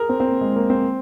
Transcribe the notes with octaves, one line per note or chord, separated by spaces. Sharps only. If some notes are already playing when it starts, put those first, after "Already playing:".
Already playing: G#4 A#4
C4
C4
A#3
G#3
A#3
C4